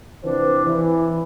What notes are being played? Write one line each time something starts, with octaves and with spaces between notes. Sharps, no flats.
C3 E3 F3 D4 G4 C5
E3